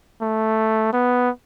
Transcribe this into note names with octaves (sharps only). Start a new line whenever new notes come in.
A3
B3